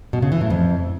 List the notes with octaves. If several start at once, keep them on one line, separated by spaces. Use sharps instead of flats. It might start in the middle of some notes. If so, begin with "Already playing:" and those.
B2
C#3
E3
A2
F2